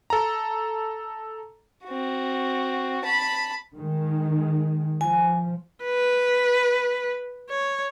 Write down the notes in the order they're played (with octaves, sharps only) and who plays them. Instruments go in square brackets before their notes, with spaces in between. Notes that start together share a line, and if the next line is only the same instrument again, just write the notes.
[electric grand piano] A4 A#5
[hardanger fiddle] C4 F#4
A5 B5
[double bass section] D#3 G#3
[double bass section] F3 [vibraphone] G#5
[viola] B4
C#5